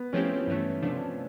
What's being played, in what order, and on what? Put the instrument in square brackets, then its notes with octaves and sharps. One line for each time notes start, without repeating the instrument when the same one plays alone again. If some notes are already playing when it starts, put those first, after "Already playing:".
Already playing: [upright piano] B3
[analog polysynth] F3 A3 C4 E4 G4 [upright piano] C#4
[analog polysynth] G2 E3 A3
C3 F3 A3 D4